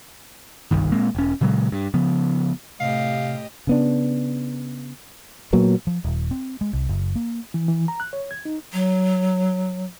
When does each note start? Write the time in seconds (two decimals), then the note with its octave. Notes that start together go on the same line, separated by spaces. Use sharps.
0.71 F#1 C2 G2 D#3
0.92 A#2 G#3 A#3 C4
1.15 E1 C#4
1.41 A#2 C#3 F#3 G#3
1.72 G2
1.94 C#3 F3 B3
2.80 A2 C3 G4 D#5 F5
3.67 C#3 B3 D4
5.53 A#2 F#3 A#3 B3
5.87 F3
6.04 D#1
6.31 C4
6.61 G#3
6.73 C2
6.89 F#1
7.16 A#3
7.54 E3
7.68 E3
7.88 A#5
8.00 F#6
8.13 C#5
8.31 G#6
8.45 D#4
8.73 F#3